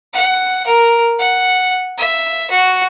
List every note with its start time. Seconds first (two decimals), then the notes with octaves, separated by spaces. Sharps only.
0.13 F#5
0.67 A#4
1.19 F#5
1.98 E5
2.51 F#4